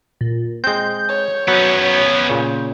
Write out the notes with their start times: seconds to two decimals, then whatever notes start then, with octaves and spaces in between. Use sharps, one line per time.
0.21 A#2
0.64 G#3 C4 G6
1.09 C#5
1.48 F#3 B3 C#4
2.29 A#2 C#3